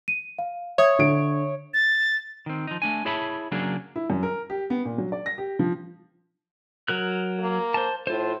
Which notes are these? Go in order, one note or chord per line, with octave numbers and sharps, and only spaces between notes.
D#7
F5
C#5 E5 D#6 G#6
D3 D7
A6
D#3 C4
F3 D#4
A3 D4 G#5
E4 G#4 C#5 E5 A5 B5
C#3 F#3 A#3 D4 G#4
E4
F#2
A#4
G4
B3
A#2
F#3
D5
A#6
G4
F3
F#3 A#4 F#6
A#3
C5 A5
A2 F4 C5